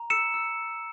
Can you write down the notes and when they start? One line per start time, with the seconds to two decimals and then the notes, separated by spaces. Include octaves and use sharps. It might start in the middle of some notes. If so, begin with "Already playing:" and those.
Already playing: A#5
0.10 E6 C#7 E7
0.34 E6